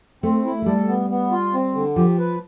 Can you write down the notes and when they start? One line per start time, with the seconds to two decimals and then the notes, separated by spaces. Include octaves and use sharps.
0.23 A3 C4
0.45 E4
0.62 A3
0.66 G3 A4
0.88 B3
1.10 B3
1.32 F4
1.54 C4
1.75 D3
1.96 F3 G4
2.18 B4